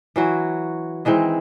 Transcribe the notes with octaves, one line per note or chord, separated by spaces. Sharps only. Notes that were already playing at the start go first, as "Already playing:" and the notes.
E3 F#3 F#4
D#3 E3 G#3 C4